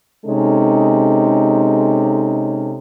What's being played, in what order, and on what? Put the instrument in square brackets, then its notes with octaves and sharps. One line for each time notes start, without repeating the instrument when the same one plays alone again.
[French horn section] C3 G#3 C#4 D#4 A4